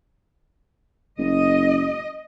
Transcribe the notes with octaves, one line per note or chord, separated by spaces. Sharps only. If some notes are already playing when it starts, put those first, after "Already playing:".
F#1 D#5